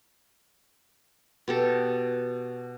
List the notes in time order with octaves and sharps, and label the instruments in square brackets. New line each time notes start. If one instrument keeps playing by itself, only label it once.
[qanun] B2 G4 A4